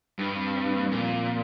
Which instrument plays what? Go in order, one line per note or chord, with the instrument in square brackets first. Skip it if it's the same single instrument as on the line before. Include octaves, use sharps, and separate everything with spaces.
[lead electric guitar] G2 [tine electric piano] G3
[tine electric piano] C4
C4
G3
A#3
G3
[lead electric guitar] A#2 [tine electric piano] F3